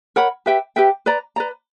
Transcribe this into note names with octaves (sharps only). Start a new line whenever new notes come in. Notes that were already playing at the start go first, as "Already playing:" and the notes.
A#4 C#5 F#5 B5
G4 B4 E5 G5
G4 B4 E5 G5
B4 D5 A#5
B4 D5 A#5